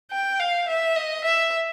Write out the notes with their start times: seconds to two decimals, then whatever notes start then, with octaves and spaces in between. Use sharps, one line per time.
0.11 G5
0.40 F5
0.68 E5
0.96 D#5
1.24 E5